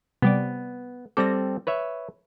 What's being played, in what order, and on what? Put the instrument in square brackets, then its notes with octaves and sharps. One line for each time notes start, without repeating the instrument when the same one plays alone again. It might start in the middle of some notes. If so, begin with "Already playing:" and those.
[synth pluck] C3 G3 D5 [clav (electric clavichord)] B3
[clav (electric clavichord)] G3 C4 A4 [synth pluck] D6 A#6
[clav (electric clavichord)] B4 C#5 E5